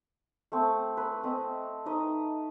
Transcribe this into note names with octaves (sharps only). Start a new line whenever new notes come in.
A3 C4
B4
C4 D#5
D#4 B4 D#5